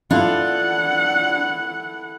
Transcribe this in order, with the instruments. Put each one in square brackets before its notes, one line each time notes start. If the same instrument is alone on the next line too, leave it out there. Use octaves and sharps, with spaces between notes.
[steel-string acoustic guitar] D4 F4 [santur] E4 A4 [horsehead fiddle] F#5